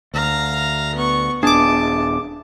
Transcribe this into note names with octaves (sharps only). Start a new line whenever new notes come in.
D2 F5 A#5
B3 C#6
D#1 B3 D4 G#4 A5 D6